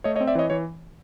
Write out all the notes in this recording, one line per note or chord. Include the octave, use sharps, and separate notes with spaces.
A3 C#5 D#5
C#5 D#5
C4
D5 E5
E3 C#5 D#5
E3 C#5